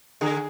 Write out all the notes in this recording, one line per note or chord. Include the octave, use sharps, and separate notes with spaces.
D3 G#4